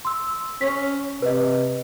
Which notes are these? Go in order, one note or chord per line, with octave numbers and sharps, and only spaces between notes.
C6 E6
C#4 B6
C3 B4 D#5